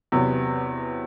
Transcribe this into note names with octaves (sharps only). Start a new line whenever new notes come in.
E2 C3 F#3 B3